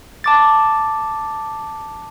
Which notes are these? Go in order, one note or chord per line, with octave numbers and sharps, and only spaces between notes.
A5 D6 A6